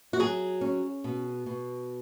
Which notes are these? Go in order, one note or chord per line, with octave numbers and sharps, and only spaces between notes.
F#4
F#3 G#4
C#4
B2
B2